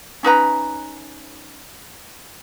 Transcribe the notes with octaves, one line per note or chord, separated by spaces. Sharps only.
C#4 D#4 B4 A#5